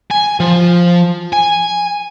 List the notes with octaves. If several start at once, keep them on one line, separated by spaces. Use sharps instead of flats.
G#5
F3
G#5